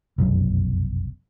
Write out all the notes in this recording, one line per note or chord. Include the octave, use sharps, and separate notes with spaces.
F1 B1 F#2